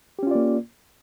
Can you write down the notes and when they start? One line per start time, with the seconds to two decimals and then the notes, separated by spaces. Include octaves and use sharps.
0.19 G4
0.23 C#4
0.27 F4
0.31 D5
0.35 A#3